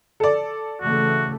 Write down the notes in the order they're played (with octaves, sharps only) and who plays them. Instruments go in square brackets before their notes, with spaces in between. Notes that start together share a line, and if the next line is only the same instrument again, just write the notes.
[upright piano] A4 D5
[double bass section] C#3 E3 A3 [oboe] F#4